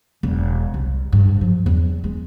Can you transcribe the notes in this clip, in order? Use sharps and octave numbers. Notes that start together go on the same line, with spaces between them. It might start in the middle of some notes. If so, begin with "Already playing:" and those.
E1
C2
G2
F3
E2
G#3